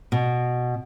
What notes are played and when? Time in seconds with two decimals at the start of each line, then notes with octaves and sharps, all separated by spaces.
0.12 B2